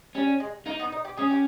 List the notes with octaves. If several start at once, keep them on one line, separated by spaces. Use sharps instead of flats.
G3 C#4
G#3
A#3 D#4
B3
D#4
G4
C#4 G#4
G4